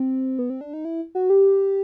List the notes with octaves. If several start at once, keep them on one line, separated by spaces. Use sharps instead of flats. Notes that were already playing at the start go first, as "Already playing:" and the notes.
Already playing: C4
B3
C4
D4
D#4
E4
F#4
G4